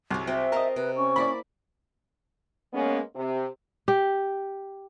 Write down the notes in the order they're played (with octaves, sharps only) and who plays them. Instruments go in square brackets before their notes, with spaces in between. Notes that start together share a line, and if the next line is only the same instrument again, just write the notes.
[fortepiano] C2 [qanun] F#3 G#4
[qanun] C4 F#4 D#5 [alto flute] E5
[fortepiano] A#4 D#5 [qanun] C5 A5 A#5
[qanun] C3 [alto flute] B4
[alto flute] C#4 [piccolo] C#6
[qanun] A#3 E4 [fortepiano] D5 B5
[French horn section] G#3 A#3 B3 C#4
C3
[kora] G4